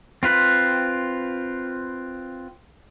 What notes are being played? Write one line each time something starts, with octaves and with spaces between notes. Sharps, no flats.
C4 F4 B4